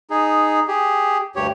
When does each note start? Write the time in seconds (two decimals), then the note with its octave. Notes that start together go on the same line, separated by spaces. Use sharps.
0.10 D#4 G#4
0.68 G4 G#4
1.36 D2 G2 G4 C#5